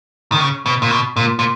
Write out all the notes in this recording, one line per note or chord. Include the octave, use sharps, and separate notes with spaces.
D#3
C#3
B2
A#2
B2
A#2
A#2